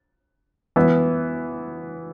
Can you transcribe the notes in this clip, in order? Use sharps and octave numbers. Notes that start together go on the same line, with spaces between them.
E3 B3 E4